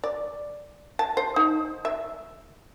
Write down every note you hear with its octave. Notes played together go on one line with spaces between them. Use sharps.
D5
A5
C5
D#4
E5